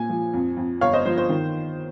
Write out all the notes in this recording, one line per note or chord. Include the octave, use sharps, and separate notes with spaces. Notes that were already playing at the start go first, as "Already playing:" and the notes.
Already playing: A#2 G#5
F3
F2
F2
G1 C#5 F5
C5 D#5
F3 C5
C5
D#3